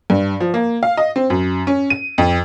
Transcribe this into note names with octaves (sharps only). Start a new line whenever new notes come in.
G2
F3
A#3
F5
D#5
C4
F#2
C#4
D#7
F2